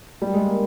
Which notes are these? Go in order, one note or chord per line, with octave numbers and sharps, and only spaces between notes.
G3
G#3
A#3